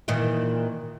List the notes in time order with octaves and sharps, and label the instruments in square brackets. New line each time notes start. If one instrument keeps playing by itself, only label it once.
[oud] A#2 D#3 E3